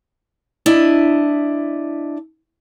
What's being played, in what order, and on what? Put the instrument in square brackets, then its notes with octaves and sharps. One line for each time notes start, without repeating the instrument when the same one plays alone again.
[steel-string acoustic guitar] D4 E4 D#5